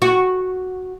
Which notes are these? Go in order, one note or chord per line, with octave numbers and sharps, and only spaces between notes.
F#4